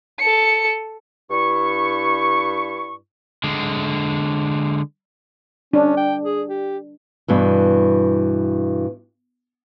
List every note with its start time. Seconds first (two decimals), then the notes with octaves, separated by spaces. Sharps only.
0.19 A4 C#7
1.30 G2 E4 C#6
3.44 D3 G#3
5.73 C#4 D4
5.97 G5
6.23 G#4
6.49 G4
7.28 G2 B2 E3